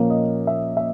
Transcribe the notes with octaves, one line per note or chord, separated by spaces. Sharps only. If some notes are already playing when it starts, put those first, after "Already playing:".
Already playing: A#2 F3 A#3 C#4
D#5
E5
E5